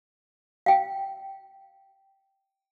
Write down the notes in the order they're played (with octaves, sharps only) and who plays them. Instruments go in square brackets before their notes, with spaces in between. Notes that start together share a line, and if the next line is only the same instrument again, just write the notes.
[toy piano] F5 G5